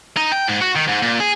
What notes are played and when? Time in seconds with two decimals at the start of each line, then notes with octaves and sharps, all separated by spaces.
0.17 D#4
0.32 G5
0.49 G#2
0.62 F#4
0.76 D#3
0.88 G#2
1.02 A#2
1.20 G#4